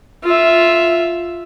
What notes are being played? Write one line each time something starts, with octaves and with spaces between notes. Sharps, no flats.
F4 E5